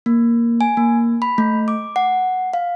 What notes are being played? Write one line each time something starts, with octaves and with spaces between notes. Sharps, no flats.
A#3
G#5
A#3
B5
A3
D6
F#5
F5